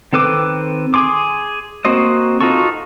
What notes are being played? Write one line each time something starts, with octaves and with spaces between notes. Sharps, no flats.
D#3 C4 A4 B4 D6
G#4 C6 D6
A#3 C4 F#4 C5 D#5
D#4 F4 F#4 A4 C#6